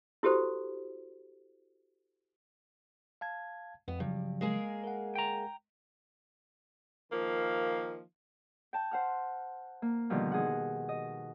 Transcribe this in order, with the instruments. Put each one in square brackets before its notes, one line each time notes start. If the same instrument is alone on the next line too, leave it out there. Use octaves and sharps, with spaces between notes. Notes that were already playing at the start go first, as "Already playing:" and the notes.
[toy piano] E4 F#4 G4 A4 C5
[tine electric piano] F5 A5 G#6
[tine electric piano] F2 [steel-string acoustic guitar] B3
[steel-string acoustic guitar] G2 [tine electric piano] C#3 F3 F#3
[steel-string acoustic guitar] G#3 A#3 G#4
[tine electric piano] A#4 F#5
[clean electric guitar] G5 A#5
[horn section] D#3 F3 A#3
[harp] G5 A5
C5 F#5 F6
A#3
B2 D3 D#3 F3 G3
D#4 G#4 F#5
D#5